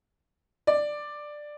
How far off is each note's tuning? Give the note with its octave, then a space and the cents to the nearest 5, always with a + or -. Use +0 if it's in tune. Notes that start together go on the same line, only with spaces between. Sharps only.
D5 +10